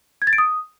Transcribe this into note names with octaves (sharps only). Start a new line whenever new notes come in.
G#6
A6
D7
D#6